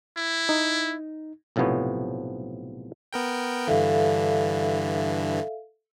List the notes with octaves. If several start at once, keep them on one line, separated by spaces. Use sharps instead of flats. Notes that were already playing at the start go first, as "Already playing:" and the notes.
E4
D#4
B1 A2 C3 F3 B3 C#5
B3 A#4 G5
G2 D3 E3 A4 E5 F5